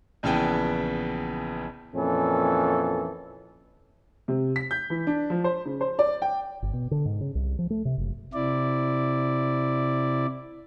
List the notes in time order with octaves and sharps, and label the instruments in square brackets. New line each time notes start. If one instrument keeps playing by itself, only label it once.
[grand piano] A#1 C#3 E3 B3 G5 A5
[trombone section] F2 A#2 E3 C#4 A4
[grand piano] C3
B6
G6
E3
D4
F3
C5
C#3
C5
D5
G5
[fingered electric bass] G1
B2
D3
G#2
C#3
C2
F3
A3
C3
F#1
[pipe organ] C3 E4 D5